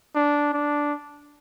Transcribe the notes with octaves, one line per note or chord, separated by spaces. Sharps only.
D4
D4